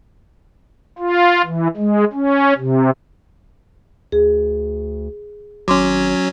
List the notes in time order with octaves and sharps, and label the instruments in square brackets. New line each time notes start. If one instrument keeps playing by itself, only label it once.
[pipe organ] F4
E3
G#3
C#4
C3
[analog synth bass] D2 [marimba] G#4
[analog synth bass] G#1 [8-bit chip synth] F#3 C#4 [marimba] C6 D6